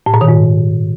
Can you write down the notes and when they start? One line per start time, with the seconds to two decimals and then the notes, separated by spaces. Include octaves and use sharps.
0.06 A2
0.14 A#2
0.21 D#3
0.28 G#2